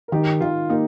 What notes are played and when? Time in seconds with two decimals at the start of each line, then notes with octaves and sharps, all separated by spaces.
0.08 A#4
0.12 D#3 D#4 G4
0.41 D#3 F4
0.69 A#3 D#4 G4